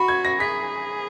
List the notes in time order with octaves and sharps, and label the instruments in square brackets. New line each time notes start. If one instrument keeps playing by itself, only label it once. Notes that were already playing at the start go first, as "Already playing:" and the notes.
Already playing: [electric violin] F#4 [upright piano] B5
[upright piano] G#6
A#6
[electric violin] G#4 [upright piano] B6